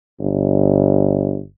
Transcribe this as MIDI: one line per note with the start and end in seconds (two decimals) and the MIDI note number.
0.19 1.41 31